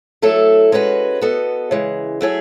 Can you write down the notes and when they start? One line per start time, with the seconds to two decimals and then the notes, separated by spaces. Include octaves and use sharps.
0.22 F#3 A3 E4 A4
0.72 G#3 C#4 F#4 B4
1.21 B3 F#4 A4 D#5
1.71 C#3 E3 G#3
2.21 F#3 A3 E4 G#4 C#5